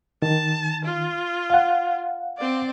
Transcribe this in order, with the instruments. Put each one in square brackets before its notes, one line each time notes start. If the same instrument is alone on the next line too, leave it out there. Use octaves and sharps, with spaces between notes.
[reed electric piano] D#3 [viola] A5
[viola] F4
[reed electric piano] F5 F#5
[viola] C4 D5